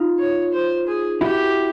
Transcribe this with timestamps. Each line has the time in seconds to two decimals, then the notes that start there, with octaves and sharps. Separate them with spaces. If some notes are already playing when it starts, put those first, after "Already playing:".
Already playing: D#4 F4
0.19 C#5
0.53 C5
0.87 G#4
1.21 E4 F#4 G4